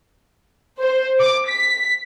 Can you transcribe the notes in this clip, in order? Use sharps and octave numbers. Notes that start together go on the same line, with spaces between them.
C5
D6
B6